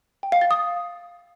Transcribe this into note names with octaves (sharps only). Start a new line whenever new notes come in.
G5
F5
A6
D#6